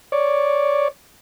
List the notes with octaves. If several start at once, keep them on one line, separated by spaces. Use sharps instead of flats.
C#5 D5